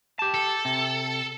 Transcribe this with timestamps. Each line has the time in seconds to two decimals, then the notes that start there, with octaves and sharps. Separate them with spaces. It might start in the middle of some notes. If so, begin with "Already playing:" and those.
0.19 G4 A5
0.34 A4
0.65 C3